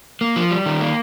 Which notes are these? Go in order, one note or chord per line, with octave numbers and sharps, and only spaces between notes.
A#3
F3
G3
D#3
A#3